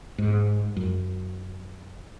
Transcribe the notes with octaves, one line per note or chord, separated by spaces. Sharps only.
G#2
F#2